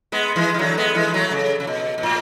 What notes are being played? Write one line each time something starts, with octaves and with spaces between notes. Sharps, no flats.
G#3 B3
E3 G#3
E3
D3 F#3
G#3 B3
E3 G#3
F#3 A3
C#3
C#3
B2
B2
A2